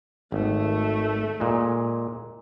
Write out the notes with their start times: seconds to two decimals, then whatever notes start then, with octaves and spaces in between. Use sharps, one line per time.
0.32 G#1 A3
1.40 A#2 G#3